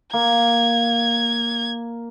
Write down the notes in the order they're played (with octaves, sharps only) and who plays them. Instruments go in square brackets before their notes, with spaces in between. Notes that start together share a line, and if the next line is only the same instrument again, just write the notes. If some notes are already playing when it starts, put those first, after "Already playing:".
[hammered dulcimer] A#3 [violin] G#6